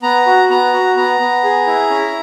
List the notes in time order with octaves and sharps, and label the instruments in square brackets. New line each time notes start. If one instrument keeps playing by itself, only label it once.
[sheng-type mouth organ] B3 A#5
F#4
B3 A#5
F#4
B3 A#5
B3
G#4
E4
C#4